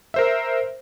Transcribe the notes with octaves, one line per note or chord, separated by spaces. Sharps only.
A#4 C5 E5